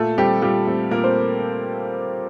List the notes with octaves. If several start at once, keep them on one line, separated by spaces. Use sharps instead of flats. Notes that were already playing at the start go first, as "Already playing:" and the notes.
Already playing: A#2 A3 A4
G3 A3 C4 G4
A#2 G3 G4
A3 C4
A#2 A#3 A#4
C4 C5